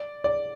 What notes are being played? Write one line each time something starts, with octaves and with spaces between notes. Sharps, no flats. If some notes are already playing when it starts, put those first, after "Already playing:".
Already playing: D5
D5